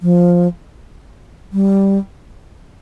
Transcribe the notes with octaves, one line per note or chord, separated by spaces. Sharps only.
F3
G3